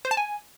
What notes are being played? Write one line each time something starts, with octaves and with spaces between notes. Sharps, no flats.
C5
A5
G#5